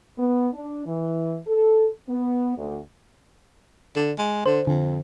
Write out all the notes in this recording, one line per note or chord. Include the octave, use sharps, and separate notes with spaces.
B3
D4
E3
A4
B3
D2
D3
G#3
D3 C5
F2 D3